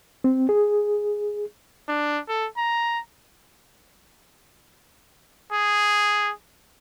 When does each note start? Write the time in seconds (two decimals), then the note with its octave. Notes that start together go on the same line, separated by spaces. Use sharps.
0.24 C4
0.49 G#4
1.88 D4
2.28 A4
2.57 A#5
5.53 G#4